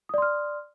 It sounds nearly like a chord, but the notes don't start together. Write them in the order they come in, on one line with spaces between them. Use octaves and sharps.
D#6 D5 C6 F6